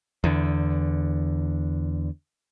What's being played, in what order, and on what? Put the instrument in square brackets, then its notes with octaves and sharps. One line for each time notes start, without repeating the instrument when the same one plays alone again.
[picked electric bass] E2 D3